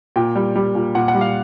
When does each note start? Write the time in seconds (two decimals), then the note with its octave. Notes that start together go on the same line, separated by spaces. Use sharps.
0.16 A#2 G5
0.35 G3
0.56 G3
0.75 A#2
0.95 A#2 F#5
1.08 F#5
1.15 G3
1.21 F5